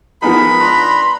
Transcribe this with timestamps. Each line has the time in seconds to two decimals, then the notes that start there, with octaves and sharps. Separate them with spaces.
0.22 F3 G#3 B3 D#4 A#4 B5
0.60 D4 B4 A#5 C6